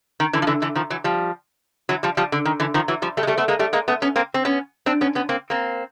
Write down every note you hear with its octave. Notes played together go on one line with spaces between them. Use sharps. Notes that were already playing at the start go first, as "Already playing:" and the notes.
D#3
D3 E3
F3
D3 E3
D3 E3
D#3 F3
E3 F#3
F3 G3
E3 F#3
F3 G3
F3 G3
D3
D#3
D3 E3
D#3 F3
E3 F#3
F3 G3
G3 A3
G#3
G3 A3
A3 B3
G#3 A#3
G3 A3
G#3 A#3
A3 B3
B3 C#4
A#3 C4
C4
B3 C#4
C4 D4
B3 C#4
B3 C#4
A#3 C4
A#3 C4